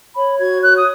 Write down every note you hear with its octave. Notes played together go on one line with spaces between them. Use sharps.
C#5 B5
F#4 G#6
C#5 F#6
D#6